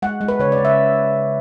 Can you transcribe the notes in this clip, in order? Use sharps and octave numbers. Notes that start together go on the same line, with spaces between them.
G#3 F#5
G#3
B4
C#3 C#5
D5
C#3
E5